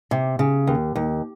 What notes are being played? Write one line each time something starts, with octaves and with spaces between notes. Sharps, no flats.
C3
C#3
D#2
D#2